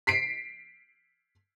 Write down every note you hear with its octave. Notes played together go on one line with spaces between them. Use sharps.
B6 C7 D7